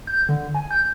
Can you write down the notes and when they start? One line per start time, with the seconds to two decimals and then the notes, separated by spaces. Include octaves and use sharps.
0.07 G6
0.29 D3
0.55 G#5
0.71 G6